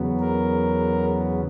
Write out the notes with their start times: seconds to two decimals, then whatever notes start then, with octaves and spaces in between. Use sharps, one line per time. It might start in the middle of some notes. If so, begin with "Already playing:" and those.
Already playing: E2 C#3 F#3 B3
0.20 A#4